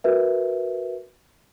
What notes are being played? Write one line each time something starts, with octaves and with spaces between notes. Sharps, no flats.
F#4 A#4 B4 E5